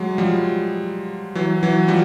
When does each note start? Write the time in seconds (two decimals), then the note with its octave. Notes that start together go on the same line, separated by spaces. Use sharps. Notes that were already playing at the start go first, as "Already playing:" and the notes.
Already playing: F#3 G#3
0.18 F3 G3
1.35 E3 F#3
1.63 E3 F#3
1.88 F3 G3